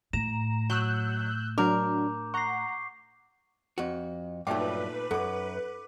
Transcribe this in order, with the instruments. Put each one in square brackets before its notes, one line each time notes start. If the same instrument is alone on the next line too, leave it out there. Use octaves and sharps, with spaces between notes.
[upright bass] A2 [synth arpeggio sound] A#5 [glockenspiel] E7
[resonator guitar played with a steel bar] F#3 [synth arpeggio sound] E6 F#6 G6
[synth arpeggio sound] F#3 D4 [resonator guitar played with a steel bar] A#4 [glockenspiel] D6 G6
[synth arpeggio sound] F#5 A#5 [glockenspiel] C#6 C7
[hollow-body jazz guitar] F2 F#4
[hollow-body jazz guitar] G2 F#3 [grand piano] A#2 A3 D6 [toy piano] D#4 G5 [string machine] B4
[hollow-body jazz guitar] F#2 [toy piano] A4 [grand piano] F#5 D6